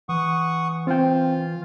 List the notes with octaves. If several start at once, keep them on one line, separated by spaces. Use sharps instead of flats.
E3 F#5 C#6 D#6
C4 F4 G5